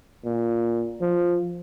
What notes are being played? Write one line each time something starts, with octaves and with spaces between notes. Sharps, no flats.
A#2
F3